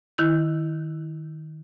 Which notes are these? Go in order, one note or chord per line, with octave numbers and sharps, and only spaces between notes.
D#3 E4 G6